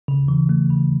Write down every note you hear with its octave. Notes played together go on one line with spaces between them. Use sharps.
C#3
E3
A3
C#3